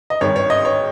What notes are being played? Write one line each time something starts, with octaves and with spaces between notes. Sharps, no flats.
D#5
G#1 G2 D#3 C#5
C#5
D#5
C#5